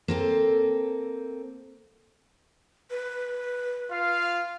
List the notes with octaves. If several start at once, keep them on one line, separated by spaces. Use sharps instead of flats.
A#3 C4 A4
B4
F4 F5